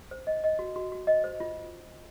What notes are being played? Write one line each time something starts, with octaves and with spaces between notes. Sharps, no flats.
C5
D#5
D#5
F#4
F#4
F#4
D#5
C5
F4